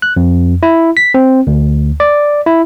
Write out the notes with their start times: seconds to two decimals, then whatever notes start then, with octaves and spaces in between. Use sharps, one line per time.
0.02 F#6
0.17 F2
0.63 E4
0.97 B6
1.14 C4
1.47 D2
2.00 D5
2.47 E4